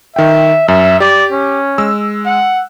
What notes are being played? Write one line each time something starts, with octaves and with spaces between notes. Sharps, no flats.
D#3 E5 G5
F#2 E5
G4 D5
C#4
G#3 E6
F#5